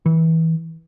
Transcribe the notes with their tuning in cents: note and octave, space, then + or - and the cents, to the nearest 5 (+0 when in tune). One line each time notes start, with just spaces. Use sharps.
E3 -25